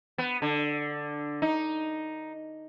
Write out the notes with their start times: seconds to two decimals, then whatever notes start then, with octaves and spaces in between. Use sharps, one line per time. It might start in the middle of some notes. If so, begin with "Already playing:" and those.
0.18 B3
0.42 D3
1.42 D#4